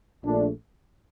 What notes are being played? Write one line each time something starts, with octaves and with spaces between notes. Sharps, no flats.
A#1 A#2 A3 D4